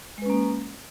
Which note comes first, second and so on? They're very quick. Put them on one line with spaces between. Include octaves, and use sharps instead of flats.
G#3 B4 C#4 A#3